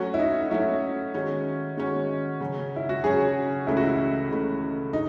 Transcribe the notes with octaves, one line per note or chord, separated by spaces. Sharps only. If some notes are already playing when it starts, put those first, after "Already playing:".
Already playing: F#3 A3 C#4 F#4
E4
D#4
F#3 A3 C#4 E4
D#3 G#3 C#4 F#4
D#3 G#3 C#4 F#4
C#3 F#3 C#4
E4
F#4
C#3 F#3 C#4 G#4
C#2 C#3 E3 A3 E4
F#4
E4
C#2 C#3 E3 A3
C#3 D#4